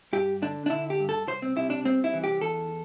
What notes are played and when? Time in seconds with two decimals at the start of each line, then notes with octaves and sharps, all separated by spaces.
0.13 G2 G4
0.42 D3 D4
0.66 D4
0.70 D3 E4
0.90 G4
1.00 G2
1.09 A4
1.27 C2 C5
1.42 C4
1.56 C3 E4
1.70 D4
1.85 C2 C4
2.04 E4
2.14 E3
2.24 G4
2.41 E2 A4